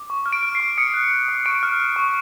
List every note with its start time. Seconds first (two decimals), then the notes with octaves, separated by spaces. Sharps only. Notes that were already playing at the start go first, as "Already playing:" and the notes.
Already playing: D6
0.10 C#6
0.26 F6
0.33 D7
0.43 F6
0.55 C7
0.60 C#6
0.78 D#6 C#7
0.94 F#6
1.11 F#6
1.28 D#6
1.46 C#6 D7
1.63 F6
1.80 F6
1.96 C#6